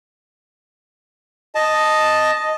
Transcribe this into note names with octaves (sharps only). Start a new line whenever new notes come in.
D#5 A5